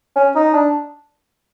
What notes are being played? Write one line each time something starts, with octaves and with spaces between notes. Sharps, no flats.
C#4
D#4
D4